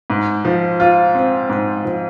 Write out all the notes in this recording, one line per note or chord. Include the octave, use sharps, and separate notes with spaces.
G#2
F3
F4
C4
G#2
F3